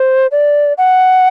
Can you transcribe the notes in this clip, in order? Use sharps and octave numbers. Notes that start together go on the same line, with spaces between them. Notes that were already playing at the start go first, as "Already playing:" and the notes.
Already playing: C5
D5
F#5